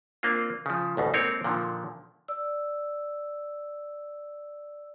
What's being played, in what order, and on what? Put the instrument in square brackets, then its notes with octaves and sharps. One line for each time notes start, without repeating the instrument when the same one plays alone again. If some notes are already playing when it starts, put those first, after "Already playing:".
[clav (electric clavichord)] A#3 C4 D4 F4
C#3 F3
A1 D2 B2
G#3 A#3 C4 D#4 A#4 C#5
A#2 D3 D#3 F3
[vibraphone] D5 E6